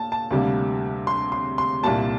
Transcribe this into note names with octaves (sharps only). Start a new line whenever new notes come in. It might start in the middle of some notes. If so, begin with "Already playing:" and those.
Already playing: A#2 A5
A5
D2 C3 G3 A#3
C6
C6
C6
C2 A#2 G3 A#3 A5